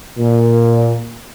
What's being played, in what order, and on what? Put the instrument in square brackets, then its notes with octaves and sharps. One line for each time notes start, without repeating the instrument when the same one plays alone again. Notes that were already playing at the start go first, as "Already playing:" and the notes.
[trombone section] A#2